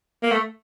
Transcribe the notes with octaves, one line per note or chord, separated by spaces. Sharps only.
A#3
A3